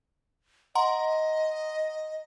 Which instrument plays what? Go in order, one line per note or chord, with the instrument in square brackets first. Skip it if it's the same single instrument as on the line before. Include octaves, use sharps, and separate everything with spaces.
[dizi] D#5 [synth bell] F#5 A#5 C6